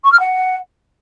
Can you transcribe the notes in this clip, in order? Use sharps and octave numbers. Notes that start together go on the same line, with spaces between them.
C#6
F6
F#5